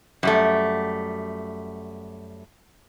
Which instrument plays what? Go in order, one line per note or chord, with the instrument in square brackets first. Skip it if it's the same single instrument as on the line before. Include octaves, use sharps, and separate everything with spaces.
[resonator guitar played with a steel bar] F#2 G3 A3